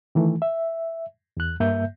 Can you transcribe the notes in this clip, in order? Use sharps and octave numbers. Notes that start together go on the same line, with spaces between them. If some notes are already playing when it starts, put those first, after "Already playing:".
D#3 E3 A3
E5
E2 F#6
G2 A#3 E5 G6